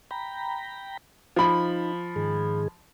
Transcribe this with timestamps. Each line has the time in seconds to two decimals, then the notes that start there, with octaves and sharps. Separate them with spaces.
0.11 G5 A#5 B5
1.36 F3 D#4 B5
2.16 G#2 D#3 G#4